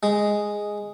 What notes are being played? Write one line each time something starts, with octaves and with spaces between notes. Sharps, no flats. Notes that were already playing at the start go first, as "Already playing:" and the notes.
G#3